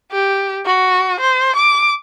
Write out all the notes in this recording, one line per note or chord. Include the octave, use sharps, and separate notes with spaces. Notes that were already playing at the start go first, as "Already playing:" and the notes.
G4
F#4
C5
D6